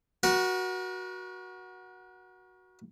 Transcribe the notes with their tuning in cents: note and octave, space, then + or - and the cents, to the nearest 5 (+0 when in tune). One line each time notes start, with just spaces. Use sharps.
F#4 +0 A#4 +45